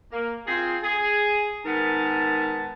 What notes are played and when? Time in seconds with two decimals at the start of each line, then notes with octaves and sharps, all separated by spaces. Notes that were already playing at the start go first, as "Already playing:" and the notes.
0.12 A#3
0.47 C4 F4 G#4
0.83 G#4
1.65 G#2 D#3 B3 A#4 A5